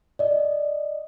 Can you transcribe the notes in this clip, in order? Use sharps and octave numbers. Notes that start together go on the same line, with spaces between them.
D5 D#5